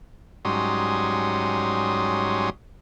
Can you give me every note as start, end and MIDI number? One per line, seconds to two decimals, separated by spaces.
0.45 2.50 44
0.45 2.50 54
0.45 2.50 55
0.45 2.50 61
0.45 2.50 84
0.45 2.50 87